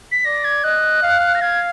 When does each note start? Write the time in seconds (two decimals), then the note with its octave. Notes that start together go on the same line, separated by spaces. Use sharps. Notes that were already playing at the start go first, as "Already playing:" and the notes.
0.12 B6
0.25 D5 A#6
0.44 G#6
0.64 D#5 F#6
1.03 F5
1.35 A#6
1.42 F5 G#6